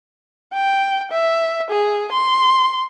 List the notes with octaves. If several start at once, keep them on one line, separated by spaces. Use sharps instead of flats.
G5
E5
G#4
C6